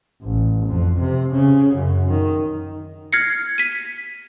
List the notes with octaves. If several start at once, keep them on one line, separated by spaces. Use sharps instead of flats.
A1
F2
C3
C#3
F#2
D#3
F6 G#6 A#6 C7 C#7
B6 D#7